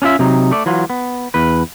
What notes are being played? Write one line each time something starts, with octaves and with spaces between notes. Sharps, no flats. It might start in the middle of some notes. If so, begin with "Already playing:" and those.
C#4 D4 F4 E5
C3 F#3 D#4
A3 D5
E3 F#3 F4
B3
E2 B4